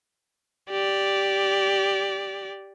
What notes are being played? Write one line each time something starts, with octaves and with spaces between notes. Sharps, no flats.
G4 D5